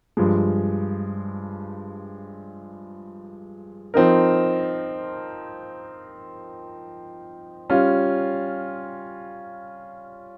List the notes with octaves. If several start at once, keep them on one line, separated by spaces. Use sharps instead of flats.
G2 F3 G#3
F3 C4 D#4 A#4
G3 C#4 F4